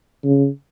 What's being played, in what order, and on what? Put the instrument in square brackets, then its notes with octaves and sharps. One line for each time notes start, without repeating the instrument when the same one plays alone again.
[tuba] C#3